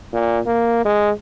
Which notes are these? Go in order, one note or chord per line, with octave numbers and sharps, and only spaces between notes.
A#2
A#3
G#3